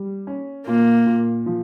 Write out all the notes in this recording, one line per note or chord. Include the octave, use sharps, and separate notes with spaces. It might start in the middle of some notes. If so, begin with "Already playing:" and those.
Already playing: G3
C#4
A#2 A#3
A#2
F3